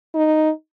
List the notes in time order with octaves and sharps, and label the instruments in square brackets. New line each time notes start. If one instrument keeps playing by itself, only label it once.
[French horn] D#4